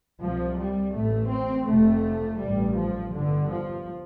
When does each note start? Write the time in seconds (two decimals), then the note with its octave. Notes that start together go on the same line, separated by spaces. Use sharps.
0.20 C2 C3 F3
0.57 G3
0.93 A1 A2 A3
1.29 C4
1.66 F1 F2 C3 A3
2.39 A1 G2 G3
2.76 F3
3.12 G1 G2 D3
3.49 F3